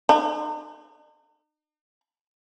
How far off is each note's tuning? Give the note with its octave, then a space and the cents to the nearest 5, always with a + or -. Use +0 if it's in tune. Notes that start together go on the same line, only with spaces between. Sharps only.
D#4 -40